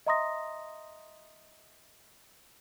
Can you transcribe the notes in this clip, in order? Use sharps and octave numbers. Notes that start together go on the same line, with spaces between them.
D#5 E5 A#5 C6 D#6 A#6